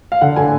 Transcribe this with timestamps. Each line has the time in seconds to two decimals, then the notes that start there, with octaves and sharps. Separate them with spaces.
0.12 F5
0.21 D3 F#5
0.36 D3 G#5